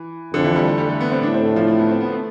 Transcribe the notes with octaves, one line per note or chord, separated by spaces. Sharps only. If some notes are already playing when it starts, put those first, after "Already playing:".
Already playing: E3
F2 D3
E3
G3
A3
G3
A3
B3
C4
A2 D4
C4
A3
F3
A3
B3
C4
B3
A3